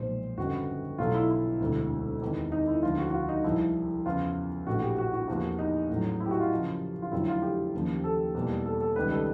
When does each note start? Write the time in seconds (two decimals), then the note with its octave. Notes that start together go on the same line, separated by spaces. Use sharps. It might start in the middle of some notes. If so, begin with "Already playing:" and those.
Already playing: B1 A#2 F3 G#3 C5
0.38 G1 F2 C#3 F#4
0.98 B1 B2 F#3 A3 F4
1.14 E4
1.30 E4
1.61 E1 D2 C3
2.22 E2 C3 D#3
2.52 D#4
2.67 E4
2.83 D2 D3 F3 F4
2.98 F#4
3.10 F#4
3.13 F4
3.29 D#4
3.44 C2 C3 F3 E4
4.06 E2 C#3 F3 F4
4.67 A#1 A2 E3 F#4
4.82 G4
4.98 F#4
5.13 F#4
5.28 E2 C3 F3 A#3 F#4
5.59 D#4
5.89 A1 A2 F#3
6.20 E4
6.26 G4
6.31 F#4
6.40 F4
6.50 F#2 C#3 F3
7.02 F4
7.12 F1 F2 D3 F#3 E4
7.28 F4
7.42 G4
7.74 D#2 C#3 F3 A#3
8.04 A4
8.35 E2 B2 G3 A#3
8.66 A4
8.81 A4
8.96 C#2 C3 D#3 G3 B4
9.11 A4